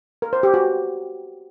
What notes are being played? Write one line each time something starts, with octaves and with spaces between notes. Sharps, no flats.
A#4
C5
G4
F#4